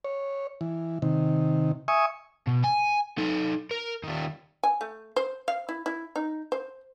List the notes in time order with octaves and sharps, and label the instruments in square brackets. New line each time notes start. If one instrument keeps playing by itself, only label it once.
[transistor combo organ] C#5
E3
C3 D#3
E5 G#5 C#6 D#6
[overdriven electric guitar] B2
G#5
D#4 A4
A#4
D#3 G3
[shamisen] G#5
A3
C5
F5
E4
E4
D#4
C5